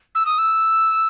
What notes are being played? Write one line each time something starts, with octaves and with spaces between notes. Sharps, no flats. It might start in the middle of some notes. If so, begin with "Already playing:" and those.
E6
D#6
E6